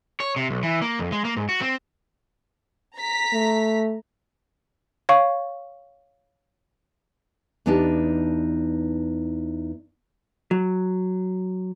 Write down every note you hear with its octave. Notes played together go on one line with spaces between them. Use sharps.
C#5
C3
B1
E3
A#3
F2
G#3
A#3
G#2
F#4
C4
A#5 B6
A3
C#5 F5 C#6
E2 B3 D4 D#4 G4 A5
F#3